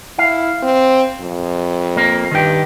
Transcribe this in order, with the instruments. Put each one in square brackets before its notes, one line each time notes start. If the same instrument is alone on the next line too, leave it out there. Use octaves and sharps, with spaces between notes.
[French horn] E4 [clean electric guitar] F5
[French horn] C4
F2
[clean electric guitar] A#3
[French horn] G2 [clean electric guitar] D#3 G4